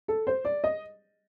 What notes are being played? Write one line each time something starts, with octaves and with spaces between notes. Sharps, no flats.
A4
C5
D5
D#5